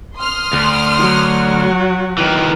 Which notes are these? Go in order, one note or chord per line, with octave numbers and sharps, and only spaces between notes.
C6 D#6 F6
D2
F#3 F#4
D#3 E3